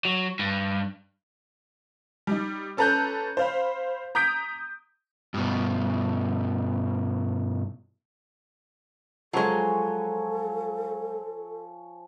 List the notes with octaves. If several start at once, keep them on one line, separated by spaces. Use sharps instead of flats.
F#3
G2
G3 D#4
C#4 A4 B4 A#5 F#6 G6
C5 F5 B5
A#5 D#6 G6 B6 D7
G2 B2
F3 F#3 G#3 A4 C#5 G#5